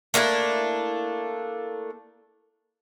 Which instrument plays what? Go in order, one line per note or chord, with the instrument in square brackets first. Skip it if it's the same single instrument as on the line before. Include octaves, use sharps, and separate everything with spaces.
[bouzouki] A3 A#3 D4 E4